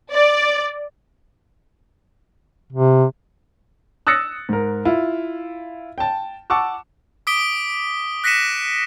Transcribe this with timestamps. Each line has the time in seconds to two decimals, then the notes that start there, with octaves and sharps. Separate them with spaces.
0.12 D5
2.73 C3
4.07 D#6 E6 F#6 A6 A#6 C#7
4.49 G#2 A#4
4.85 E4 F4
5.98 G5 A5
6.50 F#5 A5 C#6 D6 E6
7.27 D6 D#6 B6 D7 G7
8.24 F#6 A#6 B6 C#7 D#7 E7